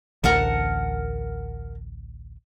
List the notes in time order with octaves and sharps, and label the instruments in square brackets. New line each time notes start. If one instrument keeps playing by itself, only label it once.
[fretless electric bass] A1 D2 [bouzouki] A#4 F#5 A5